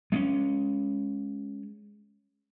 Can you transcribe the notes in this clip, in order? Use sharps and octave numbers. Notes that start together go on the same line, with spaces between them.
G#3 C4 C#4